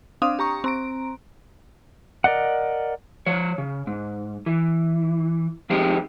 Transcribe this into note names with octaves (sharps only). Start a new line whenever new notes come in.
C4 D4 F5 D#6
G4 A#5 C#6
C4 A#5 D7
A#4 D5 D#5 F#5
F3 C#5
C#3
G#2
E3
F3 G#3 C4 D#4 G4 G#4